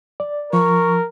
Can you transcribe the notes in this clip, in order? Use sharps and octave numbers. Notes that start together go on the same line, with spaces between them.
D5
F3 A#4 C#6